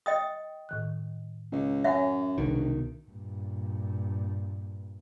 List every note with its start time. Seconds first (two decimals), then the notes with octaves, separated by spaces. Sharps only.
0.06 D#5 G5 D#6
0.69 A2 D#3 F#6
1.52 C#2
1.84 F#2 C#5 E5 F#5 G#5
2.38 E1 C2 B2 D#3
3.08 G2 A#2